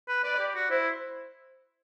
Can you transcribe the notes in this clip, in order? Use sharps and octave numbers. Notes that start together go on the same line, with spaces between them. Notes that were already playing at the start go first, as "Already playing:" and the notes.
B4
B4 D5
G4
F#4
E4 C5